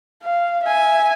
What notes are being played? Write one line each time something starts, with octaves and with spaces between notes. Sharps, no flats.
F5
E5 G#5